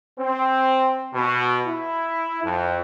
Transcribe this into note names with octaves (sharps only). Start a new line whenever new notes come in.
C4
B2
E4
F2